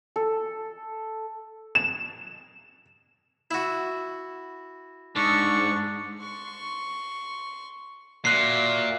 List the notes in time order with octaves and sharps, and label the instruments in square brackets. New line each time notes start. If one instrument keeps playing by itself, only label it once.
[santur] A4
[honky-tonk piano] E7
[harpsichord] E4 F#4
[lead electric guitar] G#2 [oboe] D4 [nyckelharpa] C#6
[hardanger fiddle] C6 C#6
[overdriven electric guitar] A#2 [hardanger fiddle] F#4 E5 [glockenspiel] F#6 C7